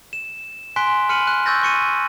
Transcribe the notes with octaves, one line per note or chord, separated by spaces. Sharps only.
E7
G#5 C6 F#6 B6 D7 G7
B5 F6 C#7 D#7 F#7
F#6
C#6 E6 G6 A6 A#6
C#6 C#7 D#7